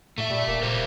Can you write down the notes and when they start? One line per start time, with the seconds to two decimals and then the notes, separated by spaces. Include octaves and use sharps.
0.18 A2 A3 E5
0.30 A#2 G3
0.47 D#1 A#3
0.63 A#2 G3 A#4 C5